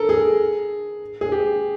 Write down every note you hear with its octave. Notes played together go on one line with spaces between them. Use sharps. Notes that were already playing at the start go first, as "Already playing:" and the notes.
Already playing: A4 A#4
G#4
G#4
G4